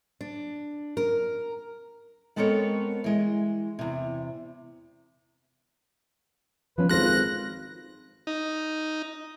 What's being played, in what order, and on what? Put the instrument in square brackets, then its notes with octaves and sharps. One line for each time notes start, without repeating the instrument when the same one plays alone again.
[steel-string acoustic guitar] D4
A#4
G#3 B3 C4 A4 A#4 C#5
E3 G#3
E2 C3
[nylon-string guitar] F3 B3 C#4 [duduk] B4
[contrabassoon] G#1 [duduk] F4 [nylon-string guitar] A4 C5 [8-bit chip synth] F#6 A#6
[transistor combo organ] D#4